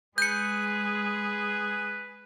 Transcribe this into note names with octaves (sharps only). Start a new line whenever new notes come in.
G#3 G#4 B4 G6 C#7